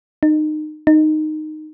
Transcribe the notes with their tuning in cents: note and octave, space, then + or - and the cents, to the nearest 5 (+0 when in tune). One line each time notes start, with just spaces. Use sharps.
D#4 -25
D#4 -10